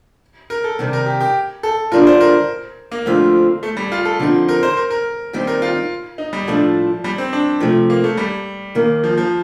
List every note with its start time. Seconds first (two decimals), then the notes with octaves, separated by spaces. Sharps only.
0.50 A#4
0.64 A4
0.79 C3 D#3 G3
0.93 A#4
1.06 G4
1.20 G4
1.63 A4
1.92 D3 G3 D4 F4 A#4
2.07 C5
2.20 A#4
2.92 A#3
3.06 F2 D3 A3 C4 F4
3.63 A3
3.77 G3
3.92 F4
4.05 A4
4.19 D3 F3 C4 D#4
4.48 A#4
4.63 C5
4.77 A#4
4.90 A#4
5.33 D#2 D#3 G3 C4 D#4
5.47 A#4
5.62 F4
6.18 D#4
6.33 G3
6.47 A2 F3 A3 D4 F4
7.04 G3
7.18 C4
7.33 D4
7.60 C3 F3 A3
7.90 A#3
8.04 A3
8.17 G3
8.75 D#2 D#3 A#3
9.04 F3
9.18 F3